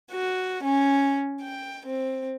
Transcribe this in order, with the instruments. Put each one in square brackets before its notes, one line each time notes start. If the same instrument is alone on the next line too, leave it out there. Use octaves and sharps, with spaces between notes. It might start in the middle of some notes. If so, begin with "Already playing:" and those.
[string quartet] F#4
C#4
G5
C4